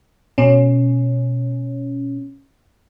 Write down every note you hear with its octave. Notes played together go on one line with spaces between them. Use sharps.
B2 C#4